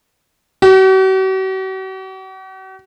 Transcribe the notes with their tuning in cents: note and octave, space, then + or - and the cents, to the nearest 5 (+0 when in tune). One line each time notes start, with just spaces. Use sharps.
F#4 +45